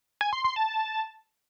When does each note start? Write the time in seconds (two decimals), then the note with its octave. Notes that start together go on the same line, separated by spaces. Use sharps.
0.21 G#5
0.33 C6
0.44 C6
0.56 A5